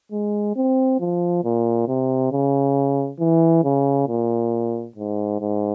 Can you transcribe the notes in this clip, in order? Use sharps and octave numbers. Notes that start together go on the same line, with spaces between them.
G#3
C4
F3
A#2
C3
C#3
E3
C#3
A#2
G#2
G#2